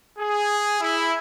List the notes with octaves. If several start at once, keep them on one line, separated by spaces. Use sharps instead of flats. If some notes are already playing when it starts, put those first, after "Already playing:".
G#4
E4